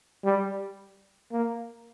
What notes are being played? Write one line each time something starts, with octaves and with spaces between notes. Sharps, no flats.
G3
A#3